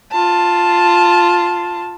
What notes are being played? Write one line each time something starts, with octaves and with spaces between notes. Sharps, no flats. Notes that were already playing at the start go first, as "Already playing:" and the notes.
F4 A5